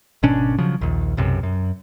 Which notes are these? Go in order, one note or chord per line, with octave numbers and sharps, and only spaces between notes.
G#1 B2 C#4 D4
C#3 F3 F#3
A#1 D#2
B1 F#2 C3
F#2